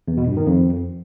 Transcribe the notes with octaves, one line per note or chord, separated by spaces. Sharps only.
E2
B2
G2
D#3
F2